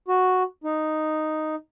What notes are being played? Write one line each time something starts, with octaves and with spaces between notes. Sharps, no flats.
F#4
D#4